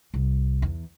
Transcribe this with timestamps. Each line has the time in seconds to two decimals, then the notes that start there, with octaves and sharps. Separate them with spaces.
0.14 C2
0.62 E2